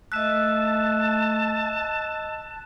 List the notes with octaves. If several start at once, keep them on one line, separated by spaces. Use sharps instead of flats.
A3 D#5 A5 E6 F#6 B6 E7